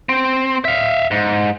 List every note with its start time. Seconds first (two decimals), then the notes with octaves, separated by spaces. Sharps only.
0.09 C4
0.65 E5 F5
1.11 G#2